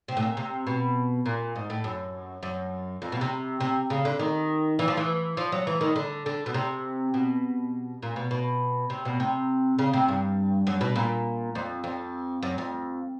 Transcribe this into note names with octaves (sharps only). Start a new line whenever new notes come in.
C3
A2
A#2
C3
B2
A#2
G#2
A2
F#2
F#2
F2
B2
C3
C3
C#3
D3
D#3
E3
F3
E3
F3
F#3
E3
D#3
D3
D3
B2
C3
B2
A#2
B2
B2
C3
B2
C3
C#3
C3
G2
F#2
B2
A#2
F2
F2
F#2
F2